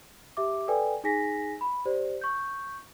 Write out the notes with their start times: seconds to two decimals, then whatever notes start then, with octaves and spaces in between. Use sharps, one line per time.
0.37 G4 E5 D6
0.68 A4 B4 D5 G5 G#5
1.04 D#4 G#4 G#5 A#6 B6
1.61 B5
1.85 G4 C5 D5
2.21 C#6 G6